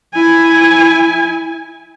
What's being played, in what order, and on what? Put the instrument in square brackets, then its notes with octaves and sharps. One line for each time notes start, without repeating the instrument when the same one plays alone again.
[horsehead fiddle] E4 G#5